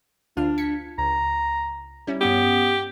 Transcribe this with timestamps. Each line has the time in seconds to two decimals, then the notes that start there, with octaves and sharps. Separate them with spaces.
0.37 D2 D4 F4 F6
0.58 G#6 B6 C#7
0.98 C#2 A#5
2.07 G3 C#4 E4
2.21 G2 B3 C#4 G4 D#6